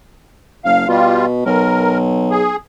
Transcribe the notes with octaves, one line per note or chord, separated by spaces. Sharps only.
F#1 F5
B2 G3 F4
B1 A#4
G#4